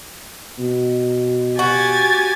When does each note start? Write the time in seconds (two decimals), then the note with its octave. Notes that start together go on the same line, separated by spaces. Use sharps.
0.59 B2
1.59 F#4 G4 G#5 A6